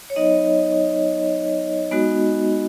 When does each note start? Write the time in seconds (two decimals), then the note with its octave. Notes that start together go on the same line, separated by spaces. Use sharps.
0.10 C#5
0.16 F#3 B3 D#4 D#5
1.91 G#3 B3 D#4 F#4